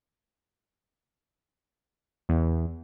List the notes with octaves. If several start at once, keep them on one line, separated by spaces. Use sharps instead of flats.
E2